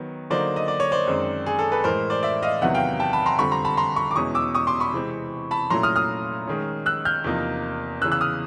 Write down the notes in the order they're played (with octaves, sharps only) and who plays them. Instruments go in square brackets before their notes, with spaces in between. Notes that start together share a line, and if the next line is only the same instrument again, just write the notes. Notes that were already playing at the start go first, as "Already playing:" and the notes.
Already playing: [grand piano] D#3 F#3 B3
D3 F#3 A#3 D#4 C5 D5
D#5
D5
C#5
C5 D5
F#2 D#3 G#3 C4
G#4
A4
A4 B4
A2 E3 G#3 A#4 C5
C5 D5
D5 E5
D#5 F5
E2 C3 D#3 F#3 B3 E5 F#5
F5 G5
G5 A5
A5 B5
A#5 C6
F2 D3 G3 C4 B5 C#6
A#5 C6
A5 B5
A#5 C6
B5 C#6
D6
E2 B2 G#3 C#4 E4 C#6 D#6
D6 E6
C#6 D#6
C6 D6
B5 C#6
C3 E3 G#3 C4
A5 B5
A#2 F#3 A3 C#4 E4 A#5 C6
D#6 F6
D#6 F6
D#3 G#3 C#4
E6 F#6
F6 G6
E2 C3 F3 A#3 D#4
E2 E6 F#6
C#3 E3
E6 F#6
D#6 F6